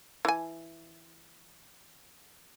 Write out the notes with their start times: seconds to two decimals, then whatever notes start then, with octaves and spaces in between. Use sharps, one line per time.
0.25 E3 G#5